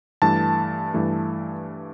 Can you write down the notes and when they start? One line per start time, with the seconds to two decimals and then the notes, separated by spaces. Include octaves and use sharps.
0.22 G2 E3 A3 A5
0.94 G2 E3 A3